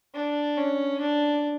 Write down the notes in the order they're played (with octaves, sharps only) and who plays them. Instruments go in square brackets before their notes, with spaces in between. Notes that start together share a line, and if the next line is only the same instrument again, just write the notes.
[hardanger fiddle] D4
C#4
D4